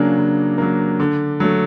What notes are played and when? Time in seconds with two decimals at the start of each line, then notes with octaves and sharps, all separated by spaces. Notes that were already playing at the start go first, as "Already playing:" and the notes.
Already playing: C#3 F#3 A#3 D4
0.17 C#3
0.58 F#3 A#3
1.00 D3
1.40 F#3 A3